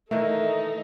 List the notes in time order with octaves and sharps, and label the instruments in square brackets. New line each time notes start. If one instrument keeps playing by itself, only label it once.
[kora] D#3 E3 A#3 [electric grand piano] A3 [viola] D#4 A4 [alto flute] E5